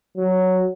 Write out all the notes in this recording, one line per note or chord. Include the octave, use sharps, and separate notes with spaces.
F#3